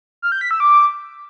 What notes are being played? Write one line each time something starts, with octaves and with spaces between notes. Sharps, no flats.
F6
G6
B6
E6
D6